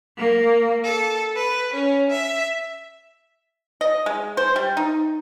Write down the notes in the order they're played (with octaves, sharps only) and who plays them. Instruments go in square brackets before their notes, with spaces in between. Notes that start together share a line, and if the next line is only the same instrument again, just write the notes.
[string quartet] A#3
A4
B4
C#4
E5
[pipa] D#5
G#3
C5
G3
D#4